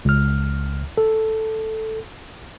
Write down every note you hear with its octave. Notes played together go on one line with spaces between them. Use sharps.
C#2 F6
A4